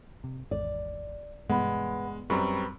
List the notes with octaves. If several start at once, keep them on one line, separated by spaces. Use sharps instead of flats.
C3
G#1 E2 G#2 D5
G2 B2 E3 G#3 B3 F#5 B5
F#2 G3 C4 B4 A#5 B5 C#6